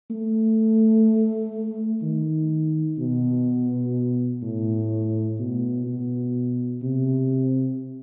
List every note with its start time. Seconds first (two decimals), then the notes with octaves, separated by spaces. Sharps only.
0.11 A3
2.03 D#3
2.99 B2
4.42 A2
5.39 B2
5.87 B2
6.82 C3